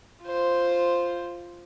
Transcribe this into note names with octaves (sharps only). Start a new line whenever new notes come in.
F4 C5